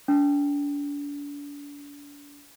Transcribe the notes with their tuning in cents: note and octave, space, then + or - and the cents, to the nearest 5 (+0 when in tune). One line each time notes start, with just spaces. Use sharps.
D4 -35